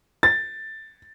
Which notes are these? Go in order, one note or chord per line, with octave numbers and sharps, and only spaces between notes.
A6